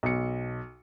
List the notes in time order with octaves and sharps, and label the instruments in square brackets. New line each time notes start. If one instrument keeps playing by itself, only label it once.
[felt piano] B1 C#7